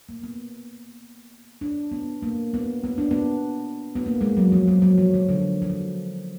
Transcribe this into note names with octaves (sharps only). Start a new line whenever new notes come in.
A#3
B3
D4
B3
A#3
B3
B3
D4
B3
B3
A#3
G#3
F#3
F3
F#3
F#3
F3
D#3
D3
F3
D#3